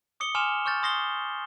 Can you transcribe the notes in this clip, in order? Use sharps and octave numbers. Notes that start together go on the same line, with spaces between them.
D6 D#6 C#7 G7
G#5 C6 D6 F6 E7 F7
C#6 F6 G6 A6
C6 D#6 A#6 C7 G7